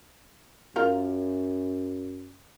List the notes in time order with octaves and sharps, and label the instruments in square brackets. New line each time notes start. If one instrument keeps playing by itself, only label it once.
[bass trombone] F#2 [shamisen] F4 A#4